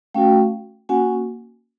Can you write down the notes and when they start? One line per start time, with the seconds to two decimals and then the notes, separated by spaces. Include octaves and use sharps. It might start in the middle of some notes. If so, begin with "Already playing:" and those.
0.14 A3 C#4 F#4 F5 G5
0.89 A#3 C#4 F#4 F#5 G#5